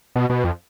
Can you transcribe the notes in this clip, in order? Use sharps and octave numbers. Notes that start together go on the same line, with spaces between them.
B2
B2
F2